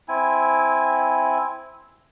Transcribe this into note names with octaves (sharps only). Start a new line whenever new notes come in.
C4 E4 G#5